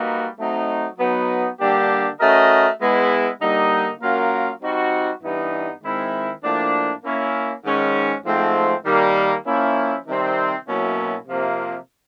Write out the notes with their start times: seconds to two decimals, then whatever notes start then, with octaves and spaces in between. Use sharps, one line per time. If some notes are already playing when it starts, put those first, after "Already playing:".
Already playing: G3 A#3 D#4 F#4 B4
0.39 F#3 A3 C4 D#4
0.99 F#3 B3 D#4
1.60 D3 G3 A#3 D4 G4
2.20 A3 C#4 F#4 A#4 D#5
2.81 G#3 B3 E4
3.42 D3 G3 A#3 D#4
4.01 F#3 A#3 C#4 F4 A#4
4.62 G3 C4 D#4 F#4
5.22 G2 E3 G3 B3 D#4
5.83 D#3 G#3 C4 E4
6.44 A2 F3 A#3 D4
7.04 A#3 C#4 E4
7.65 G#2 D#3 G#3 C#4
8.26 G#2 F3 A3 C4
8.86 D#3 G3 A#3
9.47 F3 A#3 C#4 E4
10.07 C3 D#3 G3 C4
10.67 B2 F#3 A#3 C#4 E4
11.27 C3 F3 A#3